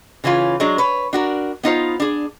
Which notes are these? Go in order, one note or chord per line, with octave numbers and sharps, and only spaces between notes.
C#3 E3 C#4 F4
F#3 G#3 D4
B4 C#5
D4 F#4 A#4
B3 D#4 F4 C5
D4 G#4